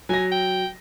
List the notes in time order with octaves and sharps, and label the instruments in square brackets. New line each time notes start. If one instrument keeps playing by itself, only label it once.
[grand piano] F#3 A#6 [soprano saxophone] G#5
[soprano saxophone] G5